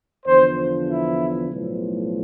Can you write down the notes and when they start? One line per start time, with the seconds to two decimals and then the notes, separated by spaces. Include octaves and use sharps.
0.25 E2 D3 F3 C5
0.88 E4
1.50 B1 A2 F3